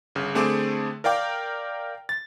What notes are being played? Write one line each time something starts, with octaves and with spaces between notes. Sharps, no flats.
G1 C#3
D3 A3 C4 G#4 D6
A#4 D5 F5 G5 D6
A6